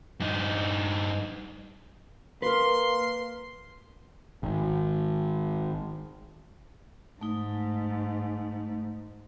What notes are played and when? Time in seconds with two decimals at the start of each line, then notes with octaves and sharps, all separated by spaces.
0.20 G2 D#4
2.42 A#3 A#4 B4 C6
4.43 G#1
7.21 G#2 A3 D#4